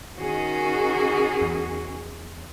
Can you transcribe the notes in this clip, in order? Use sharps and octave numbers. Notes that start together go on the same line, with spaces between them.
D#3 C#4 F#4 G#4
E2